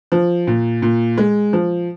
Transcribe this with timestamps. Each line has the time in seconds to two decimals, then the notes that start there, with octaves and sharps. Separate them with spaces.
0.12 F3
0.47 A#2
0.82 A#2
1.18 G#3
1.53 F3